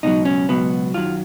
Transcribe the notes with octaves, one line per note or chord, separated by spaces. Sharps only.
C#2 B2 F#3 D#4
C#4
C#2 B2 F#3 B3
F#2 D#3 F#3 F4